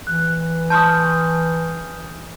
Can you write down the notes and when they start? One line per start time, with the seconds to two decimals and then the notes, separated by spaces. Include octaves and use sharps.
0.07 E3 F#6
0.70 A5 C6 C#6 D#6 F6 G6